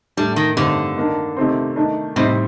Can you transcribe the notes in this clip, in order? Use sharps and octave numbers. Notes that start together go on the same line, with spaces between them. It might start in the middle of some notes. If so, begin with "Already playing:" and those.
A2 G3 A3 D4
D#3
G2 D3 D#3 A3 C4
D#3 A#3 D4
C3 D#3 A3 C4
D#3 A3 D4
A2 C3 G3 C4 D#4